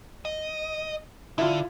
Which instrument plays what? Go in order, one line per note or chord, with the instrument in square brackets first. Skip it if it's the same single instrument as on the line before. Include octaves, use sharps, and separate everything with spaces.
[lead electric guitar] D#5
[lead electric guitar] D3 [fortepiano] E4 F4